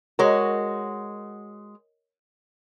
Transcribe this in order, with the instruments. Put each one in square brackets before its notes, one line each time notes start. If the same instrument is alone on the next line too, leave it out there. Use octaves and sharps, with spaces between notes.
[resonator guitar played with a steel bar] G#3 F#4 [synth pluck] A#4 C#5 D#5